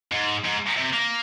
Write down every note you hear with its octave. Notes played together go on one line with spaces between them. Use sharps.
G#2
G#2
C3
A#3